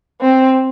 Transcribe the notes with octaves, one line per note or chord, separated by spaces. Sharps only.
C4